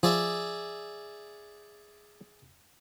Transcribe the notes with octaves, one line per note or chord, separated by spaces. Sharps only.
F3 G#4 D5 E5